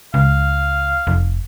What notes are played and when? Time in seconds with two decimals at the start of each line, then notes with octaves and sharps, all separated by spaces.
0.14 C#2 F5
1.07 F1